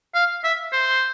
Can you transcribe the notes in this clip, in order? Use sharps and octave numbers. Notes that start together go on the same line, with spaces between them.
F5
E5
C5